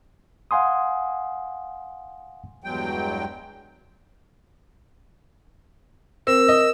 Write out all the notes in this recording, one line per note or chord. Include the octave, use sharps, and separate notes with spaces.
F5 F#5 G#5 C6 D#6
E2 G2 F#3 G#3 G5
C4 A#4 E6
D#5